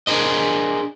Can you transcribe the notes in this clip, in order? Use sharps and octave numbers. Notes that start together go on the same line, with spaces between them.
D4 G#4 A#4 C5 D#5